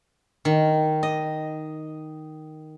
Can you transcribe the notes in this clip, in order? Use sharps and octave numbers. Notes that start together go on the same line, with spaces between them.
D#3
D#5